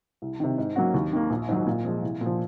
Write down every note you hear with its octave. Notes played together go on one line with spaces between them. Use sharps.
C2
C3 D#3
G#2
F#3 A#3 C#4 F#4
D#2
D#3 A#3
A#1
G#2 D#3 F#3
A#2
F3 G#3
C2
A#2
F3